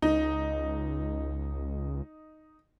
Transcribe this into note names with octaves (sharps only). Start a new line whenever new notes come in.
C#2 D#4